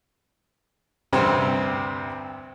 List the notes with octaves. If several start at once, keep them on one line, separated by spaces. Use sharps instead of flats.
D2 G2 C3 G3 C4 C6